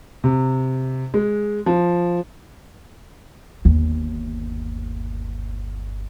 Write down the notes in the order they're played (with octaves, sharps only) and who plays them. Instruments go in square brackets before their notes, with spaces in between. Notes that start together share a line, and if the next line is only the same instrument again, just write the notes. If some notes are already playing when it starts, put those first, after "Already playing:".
[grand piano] C3
G#3
F3
[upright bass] G1 D#2